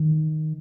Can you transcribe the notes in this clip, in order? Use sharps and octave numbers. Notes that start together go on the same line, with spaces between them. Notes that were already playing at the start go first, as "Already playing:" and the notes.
Already playing: D#3